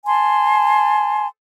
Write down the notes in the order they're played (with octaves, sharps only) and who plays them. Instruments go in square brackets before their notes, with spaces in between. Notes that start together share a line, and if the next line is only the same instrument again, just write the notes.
[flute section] G#5 A5 C6